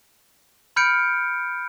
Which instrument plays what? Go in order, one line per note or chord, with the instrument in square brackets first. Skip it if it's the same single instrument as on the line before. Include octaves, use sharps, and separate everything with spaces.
[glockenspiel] B5 F6 G6 C#7 D7